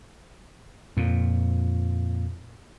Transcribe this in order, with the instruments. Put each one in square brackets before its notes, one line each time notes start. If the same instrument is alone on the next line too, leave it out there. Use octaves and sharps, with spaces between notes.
[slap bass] F2 A#2